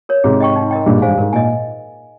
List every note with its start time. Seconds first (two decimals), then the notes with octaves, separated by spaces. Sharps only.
0.09 A#4 C#5
0.24 G#2 C3 G#4
0.40 D#5 G5 C#6
0.56 D#4
0.71 A#4 D#5 G5
0.86 G2 A#2 G#4
0.98 G#2
1.02 C5 F5 G#5
1.08 G2
1.18 G#2 A#4
1.33 A#2 D#5 G#5